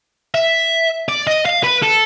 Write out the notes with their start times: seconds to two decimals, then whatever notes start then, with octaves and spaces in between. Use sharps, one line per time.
0.35 E5
1.09 D5
1.27 D#5
1.46 F5
1.64 B4
1.83 A4